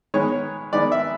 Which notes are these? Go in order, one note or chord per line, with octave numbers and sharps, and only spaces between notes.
D#3 G#3 B3 C#5
D#3 G#3 B3 D5
E5